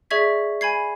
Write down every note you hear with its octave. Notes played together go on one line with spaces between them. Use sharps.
G#4 D5 E5 C#6 G#6 B6
G#5 B5 G#6 C7